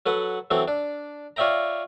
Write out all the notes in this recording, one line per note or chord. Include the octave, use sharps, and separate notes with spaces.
F#3 A4 B4 F#5
E3 F#3 C4 A4
D4
F4 C#5 D5 E5 G5 A#5